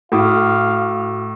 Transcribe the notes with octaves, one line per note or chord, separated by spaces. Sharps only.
A2 F#4 F5 D6 D#6